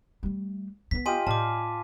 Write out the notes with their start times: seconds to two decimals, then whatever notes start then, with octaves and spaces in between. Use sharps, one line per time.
0.23 G3 A3
0.91 G2 B3 B6
1.06 F4 G4 D#5 G#5 C6 D#7
1.27 A2 D5 F5 G#5 A5 D6